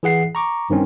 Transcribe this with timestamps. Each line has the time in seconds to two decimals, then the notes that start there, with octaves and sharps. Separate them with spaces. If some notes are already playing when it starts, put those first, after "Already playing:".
0.03 E3 G#4 F#5 C7
0.35 A#5 C#6 D6
0.70 G2 D#3 C4 C#4